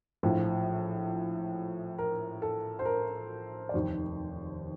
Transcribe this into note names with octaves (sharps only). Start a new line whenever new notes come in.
A#1 A2 F3
A#4
A4
C5
A#4
D5
F1 D#2 D#3 C5